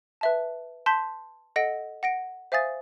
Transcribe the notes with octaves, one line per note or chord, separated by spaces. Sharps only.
B4 E5 A5
A5 C6 G6 B6
A4 D#5 F#5 A#6 D7
F#5 A#6 D7
C5 E5 F5 G#5 D#6 A6